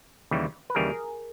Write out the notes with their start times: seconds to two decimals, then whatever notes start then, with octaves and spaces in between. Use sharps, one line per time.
0.31 D#2 C#3 E3 G3
0.70 B4
0.75 D#2 C#3 E3 G3 G#4 A#4